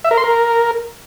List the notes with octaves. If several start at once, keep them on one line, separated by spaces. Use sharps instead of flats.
E5
A#4
C6
A#4